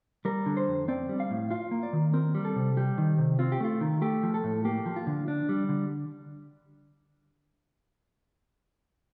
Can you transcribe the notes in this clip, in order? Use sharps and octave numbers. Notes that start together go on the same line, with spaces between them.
G3 A#4
D3
C5
F2
C4 D5
G3
F5
A2
F4 F5
A#3
D5
D#3
C4 A#4
G3
A4
C3
G3 G4
D#3
C3
C4 F4
G4
A3 F4
D#3
A3 G4
F3
A4
A2
A#3 G4
F3
F4
D3
D4
G3
D3